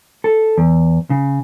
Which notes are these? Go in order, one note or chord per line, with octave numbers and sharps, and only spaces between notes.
A4
E2
C#3